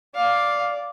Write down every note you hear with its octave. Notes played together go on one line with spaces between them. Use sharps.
D5 F5